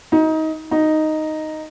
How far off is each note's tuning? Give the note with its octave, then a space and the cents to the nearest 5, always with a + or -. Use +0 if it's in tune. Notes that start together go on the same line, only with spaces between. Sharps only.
D#4 +25
D#4 +0